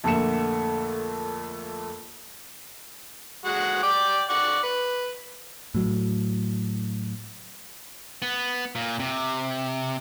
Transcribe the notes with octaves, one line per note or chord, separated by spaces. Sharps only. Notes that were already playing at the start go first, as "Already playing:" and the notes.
F2 A#2 D3 A3 C#7 E7
G#3 F#4 F#5
D5 G5 D6
D5 F#5 C#6
B4
A2 F#3
B3
A#2
C3